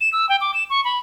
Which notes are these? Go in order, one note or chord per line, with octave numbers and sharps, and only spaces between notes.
E7
E6
G5
D6
E7
C#6
B5